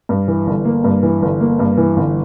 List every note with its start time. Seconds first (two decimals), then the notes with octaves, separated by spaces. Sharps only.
0.09 G2
0.28 E3
0.47 G1
0.65 A#3
0.84 G2
1.03 E3
1.22 G1
1.40 A#3
1.59 G2
1.77 E3
1.97 G1